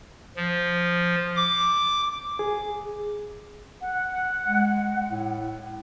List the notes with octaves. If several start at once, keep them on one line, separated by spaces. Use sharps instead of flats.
F3
D6
G#4
F#5
G#3
A2